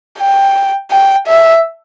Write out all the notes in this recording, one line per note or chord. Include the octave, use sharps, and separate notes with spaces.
G5
G5
E5